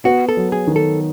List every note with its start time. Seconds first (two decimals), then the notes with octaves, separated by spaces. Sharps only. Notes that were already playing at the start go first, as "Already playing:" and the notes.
0.05 B3 F#4
0.29 A4
0.37 F#3
0.52 G#4
0.67 D#3
0.76 A4